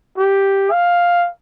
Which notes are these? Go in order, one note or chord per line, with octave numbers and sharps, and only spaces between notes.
G4
F5